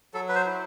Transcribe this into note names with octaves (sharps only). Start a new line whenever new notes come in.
F#3 A4
B4
C5
E4